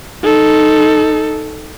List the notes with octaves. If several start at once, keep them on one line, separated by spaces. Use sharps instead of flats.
D#4 A4